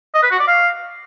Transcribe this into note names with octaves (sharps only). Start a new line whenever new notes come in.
D#5
B4
F#4
D5
F5